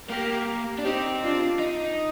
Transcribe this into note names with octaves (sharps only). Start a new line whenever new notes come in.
A#3 G4 A#4
D4
C4 D#4 G4
D4 F4
D#4